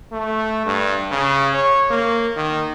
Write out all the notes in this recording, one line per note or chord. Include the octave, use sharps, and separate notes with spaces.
A3
G2
C#3
C#5
A#3
D#3